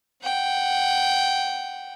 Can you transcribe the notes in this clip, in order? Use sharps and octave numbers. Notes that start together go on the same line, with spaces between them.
F#5 G5